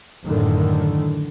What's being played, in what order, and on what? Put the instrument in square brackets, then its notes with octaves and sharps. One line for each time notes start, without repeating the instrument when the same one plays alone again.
[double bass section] F#2 A2 D3 D#3